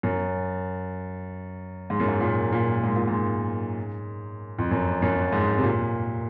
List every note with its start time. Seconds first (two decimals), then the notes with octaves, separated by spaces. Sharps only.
0.03 F#2
1.90 G#2
2.00 F#2
2.08 G#2
2.21 A#2
2.53 A#2
2.84 G#2
2.96 A#2
3.07 G#2
4.58 F2
4.71 F#2
5.02 F#2
5.33 G#2
5.58 C3
5.64 A#2